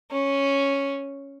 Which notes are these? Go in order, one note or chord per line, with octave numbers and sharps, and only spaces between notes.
C#4